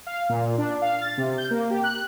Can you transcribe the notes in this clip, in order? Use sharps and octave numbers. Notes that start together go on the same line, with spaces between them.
F5
A#2
D4
F5
A6
C3
G6
A#3
G4
F#6